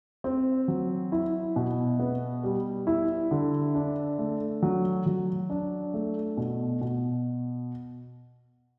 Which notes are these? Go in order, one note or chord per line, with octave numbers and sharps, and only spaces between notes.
C4
F#3
E4
B2
B3
G3
E4
D3
D4
A3
F#3
F#3
D4
A3
B2
B2